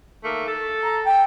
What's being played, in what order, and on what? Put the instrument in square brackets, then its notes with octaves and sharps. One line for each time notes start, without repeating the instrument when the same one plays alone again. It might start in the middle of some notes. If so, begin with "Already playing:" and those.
[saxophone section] D#3 A3 A#3
A4
[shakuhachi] A#5
G5